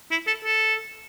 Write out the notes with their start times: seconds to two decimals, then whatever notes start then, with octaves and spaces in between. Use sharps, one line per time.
0.11 E4
0.27 A4
0.45 A4